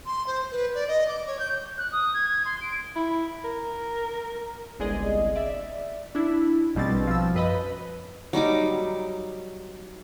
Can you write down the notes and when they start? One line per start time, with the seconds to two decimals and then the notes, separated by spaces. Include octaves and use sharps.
0.06 C6
0.27 C5
0.52 B4
0.75 D5
0.88 D#5
1.08 D6
1.27 C#5
1.39 G6
1.78 F#6
1.92 D#6
2.14 G#6
2.29 G#6
2.45 C6
2.61 D7
2.96 E4
3.44 A#4
4.79 G1 C2 G#3 G#4 D5 D#5
5.35 D5 E5
6.15 D4 E4
6.75 A#1 B2 G3 C4 A6
7.07 F3 E6
7.34 F#2 B4 D#5 B5
8.33 F#3 G3 D#4 D6